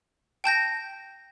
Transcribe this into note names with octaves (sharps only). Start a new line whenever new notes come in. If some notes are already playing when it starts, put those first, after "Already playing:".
G5 A5 G6 A#6